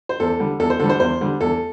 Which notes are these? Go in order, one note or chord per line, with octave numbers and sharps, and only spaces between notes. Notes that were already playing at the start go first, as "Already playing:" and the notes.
C5
E2 A4
D3 G3
E2 A4
C5
D3 G3 A4
C5
E2 C5
D3 G3
E2 A4